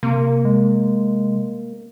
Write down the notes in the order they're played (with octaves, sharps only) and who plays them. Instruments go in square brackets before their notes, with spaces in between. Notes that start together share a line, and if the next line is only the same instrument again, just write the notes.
[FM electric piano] C3 [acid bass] A#3
[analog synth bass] G#3